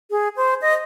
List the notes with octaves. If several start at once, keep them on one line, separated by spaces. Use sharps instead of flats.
G#4
C5
D#5